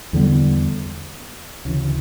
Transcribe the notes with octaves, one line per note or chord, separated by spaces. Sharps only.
E2 D3 G3 B3
D2 C#3 E3